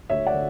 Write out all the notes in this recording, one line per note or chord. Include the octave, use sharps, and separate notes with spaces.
D2 C#5 E5
D5 F#5
D3